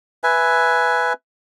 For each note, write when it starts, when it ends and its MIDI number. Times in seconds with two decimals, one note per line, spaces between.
0.24 1.13 71
0.24 1.13 76
0.24 1.13 80